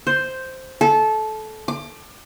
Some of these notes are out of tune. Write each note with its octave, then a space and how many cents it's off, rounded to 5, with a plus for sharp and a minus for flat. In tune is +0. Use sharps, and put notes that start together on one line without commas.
C5 +0
A4 -20
D6 +25